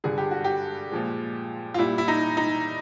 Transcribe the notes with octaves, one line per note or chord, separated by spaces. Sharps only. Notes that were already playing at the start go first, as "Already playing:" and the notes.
G2 D3 G3 G#4
G4
F#4
G4
A#2 F3 G#3
F4
A#2 G3 E4
E4
D#4
D#4